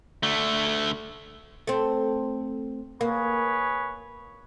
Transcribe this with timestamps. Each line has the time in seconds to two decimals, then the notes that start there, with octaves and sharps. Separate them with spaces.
0.23 D3 A3
1.67 A3 C4
3.01 A#3 G#4 B4 C#5